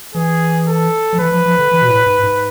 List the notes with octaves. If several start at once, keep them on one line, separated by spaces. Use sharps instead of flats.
E3 G#4
A4
F3
E3 B4
F3
F3
D3
E3
B2
A2
G#2
G#2